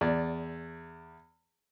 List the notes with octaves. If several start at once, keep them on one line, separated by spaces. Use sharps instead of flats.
E2 D5